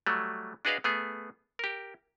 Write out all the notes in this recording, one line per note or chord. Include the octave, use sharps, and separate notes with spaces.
F#3 G3 A3
D4 F#4 G#4 B4 D#5 F5
A3 B3 G#4
G4 A#4